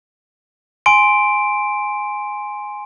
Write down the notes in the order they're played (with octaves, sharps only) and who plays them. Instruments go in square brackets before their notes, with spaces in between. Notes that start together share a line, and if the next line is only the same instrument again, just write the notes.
[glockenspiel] G#5 C6 D7